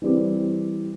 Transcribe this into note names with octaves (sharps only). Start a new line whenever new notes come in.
E3 G3 C4 G4